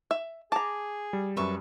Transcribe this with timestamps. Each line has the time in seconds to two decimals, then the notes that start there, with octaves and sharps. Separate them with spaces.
0.11 E5
0.52 G#4 A5 A#5 D6
1.13 G3
1.37 F#2 G3 B4 E5 C#6